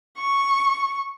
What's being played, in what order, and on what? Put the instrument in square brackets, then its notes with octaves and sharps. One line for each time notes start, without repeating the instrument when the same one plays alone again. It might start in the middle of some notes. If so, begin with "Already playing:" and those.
[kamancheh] C#6